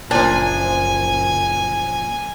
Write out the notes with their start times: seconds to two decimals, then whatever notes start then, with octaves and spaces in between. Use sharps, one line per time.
0.11 F#1 A#2 F3 D4 G#5